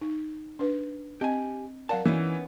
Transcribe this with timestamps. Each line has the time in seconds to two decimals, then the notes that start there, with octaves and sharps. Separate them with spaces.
0.01 D#4
0.59 D4 B4
1.21 C4 G4 D#5 G#5
1.89 F#3 A#4 D5 F5 F#5 A5
2.05 E3 B3 C#4 D#4